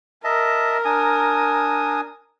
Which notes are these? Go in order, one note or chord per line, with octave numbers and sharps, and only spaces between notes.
A#4 D#5 E5 A5
D4 G#5 D#6